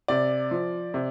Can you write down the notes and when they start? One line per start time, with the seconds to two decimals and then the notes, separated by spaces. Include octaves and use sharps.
0.08 C3 D5
0.51 F3
0.94 C3